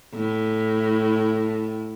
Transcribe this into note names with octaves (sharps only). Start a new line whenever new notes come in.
A2